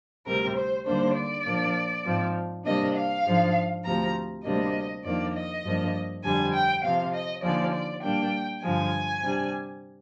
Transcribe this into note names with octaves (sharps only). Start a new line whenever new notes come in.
D2 C3 G3 C4 A#4
C5
D#2 D3 G3 A#3 D4 C5
D5
A#2 F3 A#3 D4
G#2 F3 C4
C3 G3 A#3 D4 D#5
F5
G#2 F3 G#3 D4
D2 C3 F3 A#5
D2 C3 G3 A#3 D4 D#5
F2 D#3 A#3 D4 D5
D#5
G2 F3 A#3 D4
F2 D3 G3 D4 G#5
G5
C3 F3 C4 F5
D#5
D#2 D3 F3 G#3 D5
D5
A#2 G3 A#3 D4 G5
G2 D3 F3 G#3 G#5
C3 G3 D4